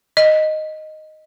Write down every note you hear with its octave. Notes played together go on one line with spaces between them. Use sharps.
D#5